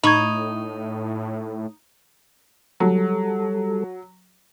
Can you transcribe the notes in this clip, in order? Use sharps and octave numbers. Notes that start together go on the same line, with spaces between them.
A2 D#4 B5 C#6 G#6
F#3 G3 A4